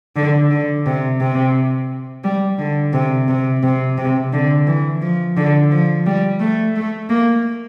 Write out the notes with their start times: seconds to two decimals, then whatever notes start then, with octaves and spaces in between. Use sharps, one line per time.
0.16 D3
0.51 D3
0.86 C3
1.21 C3
2.24 G3
2.59 D3
2.93 C3
3.29 C3
3.63 C3
3.98 C3
4.33 D3
4.67 E3
5.02 F3
5.37 D3
5.71 F3
6.07 G3
6.40 A3
6.76 A3
7.10 A#3